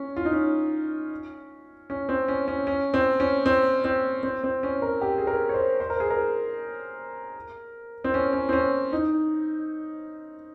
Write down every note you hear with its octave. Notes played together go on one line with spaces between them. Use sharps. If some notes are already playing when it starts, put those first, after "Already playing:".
Already playing: C#4
F4
D#4
C#4
C#4
C4
C#4
C#4
C#4
C4
C#4
C4
C4
C4
C4
C#4
A#4
G4
G#4
A#4
C#5
C5
C5
A#4
G#4
A#4
C4
C#4
C#4
C4
C#4
D#4